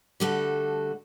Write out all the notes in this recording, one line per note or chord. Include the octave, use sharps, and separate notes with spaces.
D3 G3 A3 F#4 A4